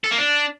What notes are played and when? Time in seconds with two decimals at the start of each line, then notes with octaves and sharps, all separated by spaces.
0.04 A4
0.11 A#3
0.18 D4